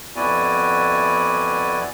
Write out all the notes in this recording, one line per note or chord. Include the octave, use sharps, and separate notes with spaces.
F2 B3 E4 F#4 D5 G#5